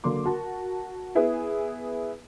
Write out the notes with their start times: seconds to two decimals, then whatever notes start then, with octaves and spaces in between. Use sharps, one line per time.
0.04 D3 F#3 A#3 C6 D6
0.25 F#4 A#4 A5
1.15 B3 E4 G#4 B4